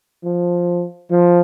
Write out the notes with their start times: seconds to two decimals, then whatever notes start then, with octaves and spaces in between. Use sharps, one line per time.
0.24 F3
1.11 F3